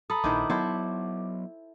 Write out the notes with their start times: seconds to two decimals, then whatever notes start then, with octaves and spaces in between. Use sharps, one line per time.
0.10 A4 A#5 B5 D#6
0.24 A#1 D#3 E4 C5 D6
0.50 F#3 B3 E4 A4 C5